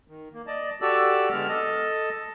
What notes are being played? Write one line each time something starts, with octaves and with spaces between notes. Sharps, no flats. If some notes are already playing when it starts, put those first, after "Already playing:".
D#3
A#3
D5 D#5 A5
F#4 G4 A4 D5 A5 E6
D3 G#3 B3 F6
A4 D#5 A5